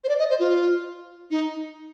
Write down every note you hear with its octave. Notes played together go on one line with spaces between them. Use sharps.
C5
D5
D#5
C5
F4
D#4